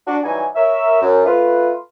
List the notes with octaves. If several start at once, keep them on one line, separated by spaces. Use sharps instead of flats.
D4 F#4
E3 F#3 G3 D#4 G#5
A#4 C#5 E5
F#2
A3 F4 B4